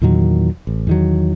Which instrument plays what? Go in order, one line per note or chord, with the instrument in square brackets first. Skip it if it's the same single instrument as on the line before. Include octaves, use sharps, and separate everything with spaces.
[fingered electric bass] E2 A#2 D#3 F#3
A1
E2 D#3 F#3